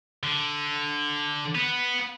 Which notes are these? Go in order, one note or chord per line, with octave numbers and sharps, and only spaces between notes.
D3
B3